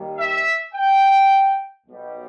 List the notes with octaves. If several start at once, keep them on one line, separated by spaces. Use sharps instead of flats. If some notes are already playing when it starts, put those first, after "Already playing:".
Already playing: D#2 D#3 G3
E5
G5
B1 B2 G3